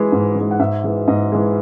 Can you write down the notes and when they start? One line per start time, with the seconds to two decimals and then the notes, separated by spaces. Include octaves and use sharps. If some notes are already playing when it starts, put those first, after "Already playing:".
Already playing: E3 G#3
0.12 G#2
0.35 E3 G#3
0.51 F#5
0.60 G#2 E5
0.84 E3 G#3
1.08 G#2 D#5
1.32 E3 G#3